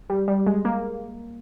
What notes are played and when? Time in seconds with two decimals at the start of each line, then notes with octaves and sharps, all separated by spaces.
0.10 G3
0.28 G3
0.47 G#3
0.65 A#3